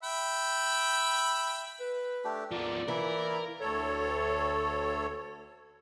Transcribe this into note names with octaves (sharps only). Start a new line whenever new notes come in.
E5 G5 B5
B4
A3 D4 G4
F3 A#3 B3 D5
E3 A#3 E4 A#4
D2 A4 C#5